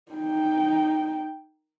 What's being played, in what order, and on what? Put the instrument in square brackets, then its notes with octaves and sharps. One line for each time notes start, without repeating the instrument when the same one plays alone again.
[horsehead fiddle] D#4 G5